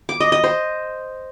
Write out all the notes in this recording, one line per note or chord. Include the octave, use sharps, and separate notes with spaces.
D6
D#5
D#5
C5